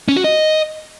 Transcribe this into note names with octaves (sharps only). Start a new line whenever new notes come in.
C#4
F#4
D#5